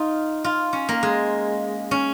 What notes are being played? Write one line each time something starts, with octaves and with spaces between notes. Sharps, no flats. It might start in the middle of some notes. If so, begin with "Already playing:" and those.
Already playing: D#4 F4
F4
C#4
A#3
G#3
C#4